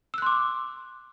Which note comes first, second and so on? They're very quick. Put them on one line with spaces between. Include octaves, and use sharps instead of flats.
E6 F#6 C6 D6